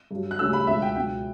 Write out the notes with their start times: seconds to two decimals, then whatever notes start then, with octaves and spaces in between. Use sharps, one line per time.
0.11 G2 F#3
0.31 F#6
0.39 D2 C#3 G3 E6
0.53 B5
0.67 C#2 B2 F#3 E5
0.82 G5
0.95 C#2 B2 F#3 G5